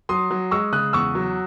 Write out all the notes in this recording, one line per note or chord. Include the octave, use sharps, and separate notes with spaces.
F#3 C6 D#6
F#3
G#3 C#6 E6
C#3 D#6 F#6
E2 C#6 E6
F#3